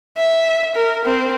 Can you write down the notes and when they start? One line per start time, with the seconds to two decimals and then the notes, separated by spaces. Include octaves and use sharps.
0.17 E5
0.75 A#4
1.05 C4